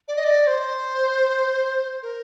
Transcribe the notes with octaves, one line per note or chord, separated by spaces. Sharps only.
D5
D#5
D5
C5
A#4